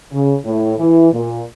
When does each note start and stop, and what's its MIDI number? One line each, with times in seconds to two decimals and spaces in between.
0.12 0.33 49
0.45 0.75 45
0.79 1.09 52
1.13 1.41 46